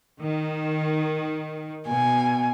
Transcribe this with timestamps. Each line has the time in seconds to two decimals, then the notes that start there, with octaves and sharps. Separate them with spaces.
0.21 D#3
1.88 B2 G#5